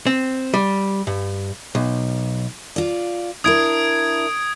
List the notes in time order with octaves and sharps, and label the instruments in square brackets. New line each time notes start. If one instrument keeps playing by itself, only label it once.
[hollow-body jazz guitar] C4
G3
G2
B1
[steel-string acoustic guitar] F4 D5
[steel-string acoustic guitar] D4 E4 A#4 [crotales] D#6 G#6 D7